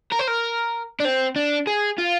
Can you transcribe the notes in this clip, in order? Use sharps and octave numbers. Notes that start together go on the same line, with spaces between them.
A#4
C5
A#4
D4
C4
D4
G#4
F4